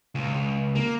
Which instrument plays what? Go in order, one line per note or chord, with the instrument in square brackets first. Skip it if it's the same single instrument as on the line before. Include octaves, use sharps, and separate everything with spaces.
[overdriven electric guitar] C#2
A#3